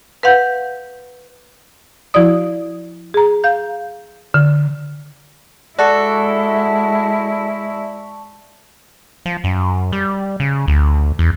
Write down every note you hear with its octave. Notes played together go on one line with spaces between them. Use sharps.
B4 F5 F#5 G6
F3 E4 F#4 D5 D#6
G#4 A#5
F5 G6
D3
G#3 E4 F#4 A4 D5 A5 C#6
F3
F#2
G3
C#3
D2
E2